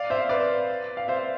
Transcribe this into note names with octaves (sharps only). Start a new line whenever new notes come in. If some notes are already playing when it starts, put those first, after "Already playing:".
Already playing: D5 F5
C5 E5
B4 D5
F5
C5 E5